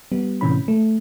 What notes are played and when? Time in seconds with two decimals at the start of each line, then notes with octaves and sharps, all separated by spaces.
0.12 G3 B3
0.41 A2 C3 E3 C#4 B5
0.68 A3